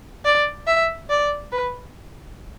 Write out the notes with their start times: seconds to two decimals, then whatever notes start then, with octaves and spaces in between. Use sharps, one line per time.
0.25 D5
0.67 E5
1.10 D5
1.52 B4